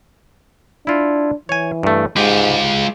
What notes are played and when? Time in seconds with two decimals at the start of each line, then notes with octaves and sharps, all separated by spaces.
0.87 D4 E4 F4
1.49 E3 C#5 G#5
1.83 G2 A3
2.17 G#2 G#3 F4 G4